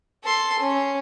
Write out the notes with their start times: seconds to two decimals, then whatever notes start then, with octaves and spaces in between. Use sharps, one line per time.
0.24 A4 C6
0.59 C#4